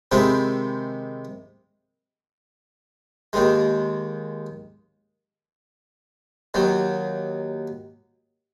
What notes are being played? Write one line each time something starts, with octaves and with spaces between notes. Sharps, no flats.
C3 D#3 G#3 C4 E4
D#2 D#3 G#3
D#2 D#3 F#3